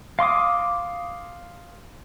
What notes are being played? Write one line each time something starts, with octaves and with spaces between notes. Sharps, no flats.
F5 C6 D6 D#6